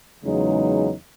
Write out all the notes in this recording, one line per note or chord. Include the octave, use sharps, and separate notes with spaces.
E2 C#3 F#3 G#3 D#4